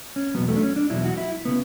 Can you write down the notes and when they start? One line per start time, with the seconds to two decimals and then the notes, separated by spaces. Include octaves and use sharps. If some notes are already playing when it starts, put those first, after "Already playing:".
0.16 C#4
0.35 E2 B2 F#3 B3
0.48 A3
0.56 D4
0.63 C#4
0.76 D4
0.90 E2 B2 F#3 E4
1.04 F#4
1.18 E4
1.45 C#3 B3